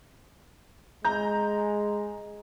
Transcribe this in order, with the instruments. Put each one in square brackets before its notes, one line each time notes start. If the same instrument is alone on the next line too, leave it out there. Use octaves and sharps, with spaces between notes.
[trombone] G#3 [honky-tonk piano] A#5 G6